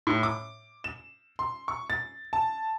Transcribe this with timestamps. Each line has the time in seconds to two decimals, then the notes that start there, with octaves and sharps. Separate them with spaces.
0.07 A2
0.23 D6
0.84 E7
1.39 C6
1.68 C#6
1.90 A6
2.33 A5